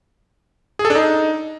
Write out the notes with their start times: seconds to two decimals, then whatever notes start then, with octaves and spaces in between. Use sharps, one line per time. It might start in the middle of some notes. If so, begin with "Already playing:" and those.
0.79 G#4
0.85 A4
0.90 D4
0.95 D#4